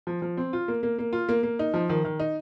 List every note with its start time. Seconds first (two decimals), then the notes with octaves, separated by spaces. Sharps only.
0.07 F3
0.22 F3
0.37 C4
0.53 F4
0.68 A#3
0.83 A#3
0.98 A#3
1.13 F4
1.29 A#3
1.43 A#3
1.59 D#4
1.74 F3
1.89 D#3
2.05 D#3
2.20 D#4